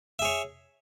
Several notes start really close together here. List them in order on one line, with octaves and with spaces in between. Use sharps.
E5 G#4 C#5